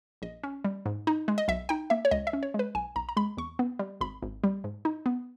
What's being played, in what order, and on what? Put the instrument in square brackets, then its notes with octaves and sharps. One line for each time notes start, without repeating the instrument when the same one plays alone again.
[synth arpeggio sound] A#1 D#5
C#4
G3
G#2
D#4
G#3
D#5
B1 E5
D#4 G5
A#3 E5
C#5
C#2 D#5
E5
C#4
C#5
G#3
B4
B1 G#5
B1 A#5
A#5
G#3 B5
E2 C#6
B3
G3
G#1 B5
G#1
G3
G#2
D#4
B3